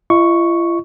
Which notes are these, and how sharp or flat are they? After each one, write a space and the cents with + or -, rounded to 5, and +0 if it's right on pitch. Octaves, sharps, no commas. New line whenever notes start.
F4 -45 D#5 +0 C#6 +0